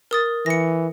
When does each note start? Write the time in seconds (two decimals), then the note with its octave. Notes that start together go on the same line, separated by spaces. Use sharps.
0.11 A#4 D#6 A6
0.46 E3 A#6 C#7